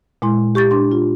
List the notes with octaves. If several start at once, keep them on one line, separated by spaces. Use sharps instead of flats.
A#2 G#3 E4 C6
G4 C#6 G6 A6
D4 C6
F4